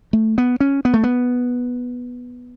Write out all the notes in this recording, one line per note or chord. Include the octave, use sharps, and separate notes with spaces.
A3
B3
C#4
B3
A3
B3